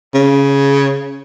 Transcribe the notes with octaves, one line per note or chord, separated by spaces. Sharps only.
C#3